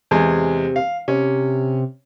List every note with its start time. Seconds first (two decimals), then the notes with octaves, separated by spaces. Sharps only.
0.11 E2 C3 G#3
0.76 F5
1.08 C3 C#4